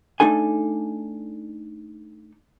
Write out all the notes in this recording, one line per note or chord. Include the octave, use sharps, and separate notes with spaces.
A3 D4 D#4 A4 G#5